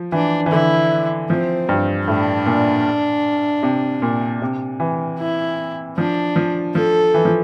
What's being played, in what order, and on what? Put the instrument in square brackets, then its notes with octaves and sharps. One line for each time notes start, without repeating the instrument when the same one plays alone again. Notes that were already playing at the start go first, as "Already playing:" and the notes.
Already playing: [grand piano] F3
[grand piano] E3 [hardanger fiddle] D4
[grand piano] E3
[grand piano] D3 [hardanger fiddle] E4
[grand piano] F3 [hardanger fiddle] C4
[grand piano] G2
[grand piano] A2 [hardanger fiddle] D4
[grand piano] A#2
C3
A#2
C3
E3
[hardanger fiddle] E4
[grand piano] F3 [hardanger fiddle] D4
[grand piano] F3
[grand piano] F3 [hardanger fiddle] A4
[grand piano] E3
F3